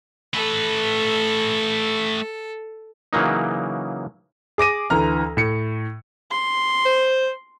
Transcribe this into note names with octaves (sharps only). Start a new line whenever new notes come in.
A3 A4 B4
C#3 E3 F#3 A#3 D#4
G#4 D6 A#6 D#7
D2 E3 A#5 F6
A2 C#7
C6
C5